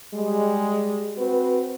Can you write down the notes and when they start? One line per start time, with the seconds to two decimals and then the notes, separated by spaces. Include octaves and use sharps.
0.14 G3 G#3
1.17 C4 F#4 B4